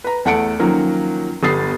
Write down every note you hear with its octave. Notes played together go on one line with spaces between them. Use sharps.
B4 A#5
E2 A3 F#5 A5 C#7 D7
D#3 F3 F#3 A#3 C#4
G1 B3 G4 D#6 A6 C7